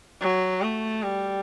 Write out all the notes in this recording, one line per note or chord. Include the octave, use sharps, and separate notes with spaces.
F#3
A3
G3